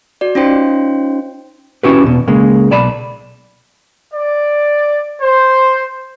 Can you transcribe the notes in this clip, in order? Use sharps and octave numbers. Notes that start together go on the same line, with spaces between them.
F#4 D5
C#4 D#4 F4 C5 G5 C6
C#4 E4 F#4 G4 B4
E2 B2
C#3 G#3 A#3
B1 D5 A5 B5
D5
C5